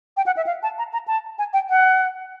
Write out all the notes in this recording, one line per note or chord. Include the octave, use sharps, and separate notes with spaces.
G5
F#5
E5
F5
A5
A#5
A#5
A5
G#5
G5
F#5